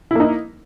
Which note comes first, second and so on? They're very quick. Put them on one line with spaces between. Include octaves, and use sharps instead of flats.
E4 A#3 D#4